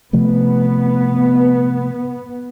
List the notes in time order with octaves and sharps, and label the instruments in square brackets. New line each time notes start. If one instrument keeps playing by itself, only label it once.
[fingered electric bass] C3 F3 A3 [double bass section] B3